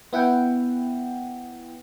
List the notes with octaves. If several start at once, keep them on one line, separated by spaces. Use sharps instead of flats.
B3 E4 F#5 G5